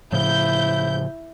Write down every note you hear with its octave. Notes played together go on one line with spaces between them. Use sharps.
A2 C#3 F3 E4 G6